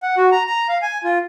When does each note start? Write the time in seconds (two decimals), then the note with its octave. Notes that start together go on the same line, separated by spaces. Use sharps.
0.03 F#5
0.17 F#4
0.32 A#5
0.47 A#5
0.69 F5
0.82 G#5
1.04 F4